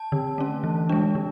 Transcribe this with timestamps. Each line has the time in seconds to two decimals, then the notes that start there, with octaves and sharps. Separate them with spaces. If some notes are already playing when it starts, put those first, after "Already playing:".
Already playing: A5
0.12 D3
0.38 A3 C#4
0.64 E3
0.89 G#3 D4
1.15 D3